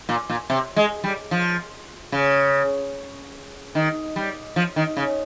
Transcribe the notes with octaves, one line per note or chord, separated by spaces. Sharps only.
A#2
A#2
C3
G#3
G3
F3
C#3
D#3
G3
F3
D#3
C#3